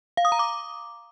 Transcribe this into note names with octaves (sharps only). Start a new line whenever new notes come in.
F5
D#6
A#5
D6